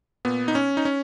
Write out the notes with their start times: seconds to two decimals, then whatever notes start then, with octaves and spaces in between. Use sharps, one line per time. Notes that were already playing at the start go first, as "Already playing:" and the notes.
0.25 A#2 B3
0.48 D#4
0.55 C#4
0.77 D#4
0.85 C#4